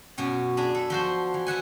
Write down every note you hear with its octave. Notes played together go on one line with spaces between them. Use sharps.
F#2 B2 C#4
D4 G#4 A#5 B5
A4
F3 F#4 C5
E3
B4 E5 F#5 G#5